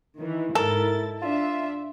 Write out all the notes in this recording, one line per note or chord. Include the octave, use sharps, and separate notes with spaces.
D#3 E3
G#2 E4 A4 A#4 A6
D4 F4 E5